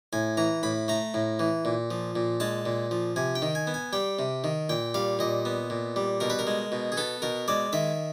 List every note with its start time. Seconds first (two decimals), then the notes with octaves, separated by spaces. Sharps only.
0.13 A2 G#5
0.37 E3 A#5
0.63 A2 B5
0.88 A3 A#5
1.14 A2
1.39 E3
1.65 A#2
1.91 F3
2.16 A#2
2.40 G#3 A5
2.66 A#2
2.91 F3
3.16 C3 G#5
3.35 G5
3.42 D#3
3.55 G#5
3.67 B3
3.74 G#5
3.93 G3 G5
4.19 C3
4.44 D#3
4.69 A#2 G5
4.94 G3 F5
5.19 A#2 D#5
5.45 B3
5.70 A#2
5.96 G3
6.20 B2 A#4
6.30 B4
6.39 A#4
6.47 G#3
6.72 B2
6.92 G#4
6.97 B3 A4
7.22 B2 A#4
7.48 G#3 D5
7.73 D#3 E5